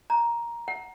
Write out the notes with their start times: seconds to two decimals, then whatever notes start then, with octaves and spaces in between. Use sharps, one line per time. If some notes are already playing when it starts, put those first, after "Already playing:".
0.10 A#5
0.68 F#5